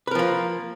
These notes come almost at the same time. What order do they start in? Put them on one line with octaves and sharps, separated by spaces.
B4 A#4 F3 A#3